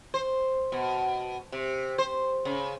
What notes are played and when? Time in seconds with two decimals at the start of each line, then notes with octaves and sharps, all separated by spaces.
0.14 C5
0.72 B2
1.52 C3
1.98 C5
2.45 C#3